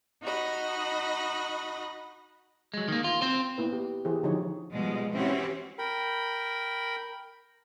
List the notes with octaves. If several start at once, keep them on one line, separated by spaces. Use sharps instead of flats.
D#4 F#4 D#5 B5
F#3 G#3
D#3 A#3
F4
C4 C5
A#3 B3 E4 B4
G4
E3 E4 G4 G#4 C5
D3 F3 D#4 E4 F#4 C#5
B2 F3 G3 G#3
E3 C4 C#4 E4 F#4 G4
A#4 G5 B5